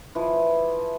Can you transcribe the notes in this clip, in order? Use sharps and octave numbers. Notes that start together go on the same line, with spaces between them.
E3 F3